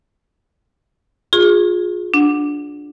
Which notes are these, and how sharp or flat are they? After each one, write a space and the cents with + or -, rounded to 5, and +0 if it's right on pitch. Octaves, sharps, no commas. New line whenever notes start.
F4 +30 G#4 +0 C#6 -40
D4 +0 F#5 -15